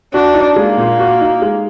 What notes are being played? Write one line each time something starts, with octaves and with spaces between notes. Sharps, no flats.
D4 F#4
D#4
G#3 A#3
A#2
F#4
D#4
G#3